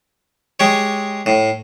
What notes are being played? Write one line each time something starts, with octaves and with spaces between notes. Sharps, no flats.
G#3 G4 C#5
A2